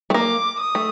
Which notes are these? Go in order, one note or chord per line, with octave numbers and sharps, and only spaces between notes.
A3
A#3 D6
D#6
A3